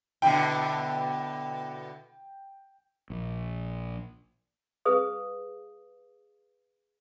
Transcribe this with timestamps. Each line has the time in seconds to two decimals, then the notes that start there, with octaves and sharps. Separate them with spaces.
0.22 B2 D3 E4 G5
3.10 A#1
4.85 G#4 B4 F5 D#6